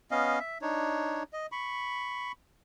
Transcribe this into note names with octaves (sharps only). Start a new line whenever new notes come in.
B3 C#4 D#5 F5
E5
D4 D#4 C#5
D#5
B5 C#6